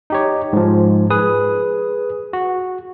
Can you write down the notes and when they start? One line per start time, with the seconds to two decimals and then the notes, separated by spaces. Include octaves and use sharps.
0.10 D#4 G4 C#5
0.53 G#2 F3
1.10 G#4 B4 D#6
2.33 F#4